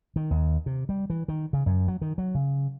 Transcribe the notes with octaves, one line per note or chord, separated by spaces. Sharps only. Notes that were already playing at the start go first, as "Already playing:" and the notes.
D#3
D#2
C3
G3
E3
D#3
C#3
F#2
F#3
D#3
F#3
C#3